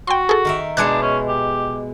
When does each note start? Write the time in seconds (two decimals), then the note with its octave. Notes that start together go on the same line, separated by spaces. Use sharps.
0.07 F#4 G5 C6
0.29 G#4 A4
0.45 D#3 A#4 E5
0.77 B2 G#3 D4 E4 F#6 G#6 C#7
1.02 C#4
1.28 G4